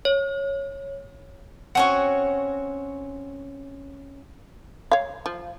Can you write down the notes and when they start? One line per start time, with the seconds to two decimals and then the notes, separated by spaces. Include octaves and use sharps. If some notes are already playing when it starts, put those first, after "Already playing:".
0.05 C#5
1.75 C4 C#4 F#4 F#5 G#5 C#6
4.92 C#5 F5
5.26 F3